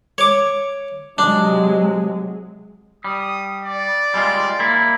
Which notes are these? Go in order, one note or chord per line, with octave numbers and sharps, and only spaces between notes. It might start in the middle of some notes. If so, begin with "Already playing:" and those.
C#5 D6
C3 F#3 G#3 D4
G3 D#6
D5
G3 G#3 F4
A#3 E4